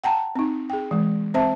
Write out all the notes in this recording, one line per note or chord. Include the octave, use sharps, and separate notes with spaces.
F#5 G5 A5 A#5
C4 D#4
G#4 G5
E3 G#3
C4 C5 E5 A5